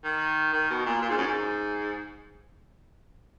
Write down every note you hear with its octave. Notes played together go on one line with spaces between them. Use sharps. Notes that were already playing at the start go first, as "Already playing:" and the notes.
D#3
D#3
B2
A#2
A#2
G#2
F#2
G#2